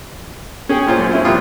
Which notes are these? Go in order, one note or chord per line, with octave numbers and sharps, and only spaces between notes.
C#4 G#4 G5
A#2 F4 C5 C#5
F#2
C4 C#4 E4
A#1 G3 F4 D#6